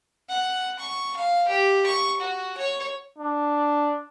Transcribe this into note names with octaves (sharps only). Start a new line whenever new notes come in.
F#5
C#6
F5
G4
C#6
F#4
C#5
D4